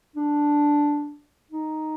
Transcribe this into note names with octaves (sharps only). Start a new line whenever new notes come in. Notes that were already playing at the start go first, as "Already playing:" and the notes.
D4
D#4